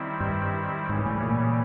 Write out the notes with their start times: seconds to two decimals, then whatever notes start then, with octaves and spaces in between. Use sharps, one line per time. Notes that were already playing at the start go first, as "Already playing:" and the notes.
Already playing: D#3 G3 C4 E4
0.20 G2
0.89 G#2 C#3 E3 G3
1.06 A2
1.23 A#2